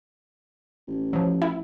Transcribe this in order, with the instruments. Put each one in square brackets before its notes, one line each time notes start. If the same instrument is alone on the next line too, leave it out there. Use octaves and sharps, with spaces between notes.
[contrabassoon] A1
[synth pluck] F3 F#3
[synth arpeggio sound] E4